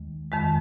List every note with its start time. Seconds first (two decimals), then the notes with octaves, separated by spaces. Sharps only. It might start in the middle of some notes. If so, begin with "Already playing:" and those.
Already playing: D#2 D#3 G#3
0.32 F2 D#3 G#3